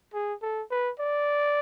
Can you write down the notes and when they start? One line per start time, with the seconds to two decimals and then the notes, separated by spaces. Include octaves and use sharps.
0.14 G#4
0.42 A4
0.71 B4
1.00 D5